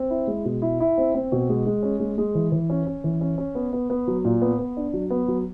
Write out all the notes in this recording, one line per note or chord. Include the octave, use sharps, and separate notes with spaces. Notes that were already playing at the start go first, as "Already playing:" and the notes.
Already playing: C4
E4
G#3
B2
E4
E4
C4
C4
B2
G#3
G#3
C#4
G#3
G#3
E3
E3
C#4
C#4
E3
C#4
C#4
B3
B3
B3
F#3
A#2
B3
B3
D4
F#3
B3
F#3